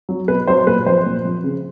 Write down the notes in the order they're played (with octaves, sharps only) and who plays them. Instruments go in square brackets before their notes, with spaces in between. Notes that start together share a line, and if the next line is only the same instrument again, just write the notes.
[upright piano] F#3
B2 B4
F#3 C5
A#2 B4
F3 C5
A#2
F3
C#3